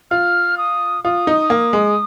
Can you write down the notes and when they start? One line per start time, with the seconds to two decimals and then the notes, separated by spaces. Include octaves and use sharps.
0.11 F4 F6
0.58 D#6
1.04 F4 D#6
1.27 D#4
1.50 A#3
1.73 G#3